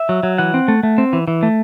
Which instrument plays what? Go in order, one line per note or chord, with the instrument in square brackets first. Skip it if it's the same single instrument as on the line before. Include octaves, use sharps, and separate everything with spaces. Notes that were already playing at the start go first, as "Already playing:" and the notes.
Already playing: [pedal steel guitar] E5
F#3
F#3
E3 F#5
C4
A3
A3
C4
E3
E3
A3